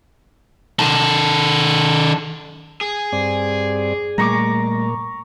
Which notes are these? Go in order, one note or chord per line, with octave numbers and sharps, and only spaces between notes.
D#3 A4
G#4
G2 C4 D5
A#2 G3 A3 A#5 C#6 D6